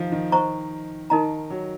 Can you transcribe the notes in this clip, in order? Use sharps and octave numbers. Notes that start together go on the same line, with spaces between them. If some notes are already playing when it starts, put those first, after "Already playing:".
Already playing: D#3 F3
D#3
C5 D#5 A#5 C#6
D#3 D#4 A#4 D#5 A#5
F#3